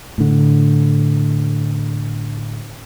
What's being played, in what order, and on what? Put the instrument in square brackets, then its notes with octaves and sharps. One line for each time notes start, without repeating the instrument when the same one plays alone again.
[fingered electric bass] A2 D3